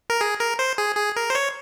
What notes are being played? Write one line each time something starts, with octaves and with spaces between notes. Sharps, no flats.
A#4
G#4
A#4
C5
G#4
G#4
A#4
C5
C#5